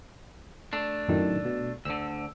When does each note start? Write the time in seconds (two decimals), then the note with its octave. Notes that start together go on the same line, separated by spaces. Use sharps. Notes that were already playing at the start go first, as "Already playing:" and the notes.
0.73 A3 D4
1.08 F#2 A2 D#3
1.45 B2
1.85 D2 D3 E6